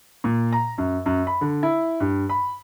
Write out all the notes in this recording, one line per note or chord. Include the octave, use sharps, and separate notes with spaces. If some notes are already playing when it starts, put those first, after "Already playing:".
A#2
A#5
F#2
F#2
B5
D3
E4
G2
B5